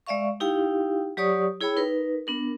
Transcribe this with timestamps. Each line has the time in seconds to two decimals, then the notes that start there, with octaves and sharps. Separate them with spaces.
0.07 G#3 D5 E5 F5 C#6
0.40 D#4 E4 G4 F5 G5
1.17 F#3 G4 C#5 D5 C#6 D#6
1.61 E4 G#4 C#5 G5 B5 E6
1.76 D#4 A#4 B4
2.27 B3 D4 A#4